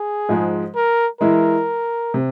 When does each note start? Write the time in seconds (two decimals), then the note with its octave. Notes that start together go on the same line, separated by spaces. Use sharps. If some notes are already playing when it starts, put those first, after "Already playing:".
Already playing: G#4
0.29 G#2 F3 G#3
0.76 A#4
1.21 E3 G#3 E4 A#4
2.14 C3